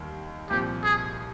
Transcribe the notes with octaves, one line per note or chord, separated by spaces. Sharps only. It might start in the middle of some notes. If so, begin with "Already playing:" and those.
Already playing: D#2 D#3 G3
C2 A#2 F3 C4 G4
G#4